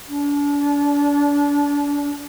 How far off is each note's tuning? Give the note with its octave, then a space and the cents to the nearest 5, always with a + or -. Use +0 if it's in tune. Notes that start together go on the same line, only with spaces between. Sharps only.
D4 -35